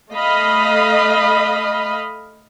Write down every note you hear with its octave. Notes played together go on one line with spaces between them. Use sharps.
A3 D#5 F5 B5